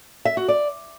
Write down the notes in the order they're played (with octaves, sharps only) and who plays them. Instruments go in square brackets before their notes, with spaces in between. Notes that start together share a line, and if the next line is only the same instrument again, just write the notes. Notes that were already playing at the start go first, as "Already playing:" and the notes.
[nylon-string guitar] E5
F#4
D5